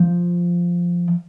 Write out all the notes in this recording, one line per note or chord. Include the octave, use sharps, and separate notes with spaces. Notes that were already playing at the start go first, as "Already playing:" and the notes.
Already playing: F3